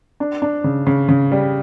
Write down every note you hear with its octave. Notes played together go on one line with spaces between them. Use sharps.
D4
D4
C#3
C#3
C#3
G3